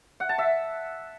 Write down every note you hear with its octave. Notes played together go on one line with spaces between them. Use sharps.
F#5
A5
E5